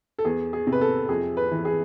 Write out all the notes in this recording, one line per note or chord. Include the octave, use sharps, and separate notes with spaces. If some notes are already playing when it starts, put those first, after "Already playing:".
A4
E2 G#4
G#4
C3
B4
A4
F2 G#4
B4
E3
G#4